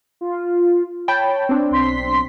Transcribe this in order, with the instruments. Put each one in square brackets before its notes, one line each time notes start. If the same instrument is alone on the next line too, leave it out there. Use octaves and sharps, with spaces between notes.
[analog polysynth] F4
[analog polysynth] C#5 [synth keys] G5 A5 B5
[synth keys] C4 D4
[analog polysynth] B1 C6 B6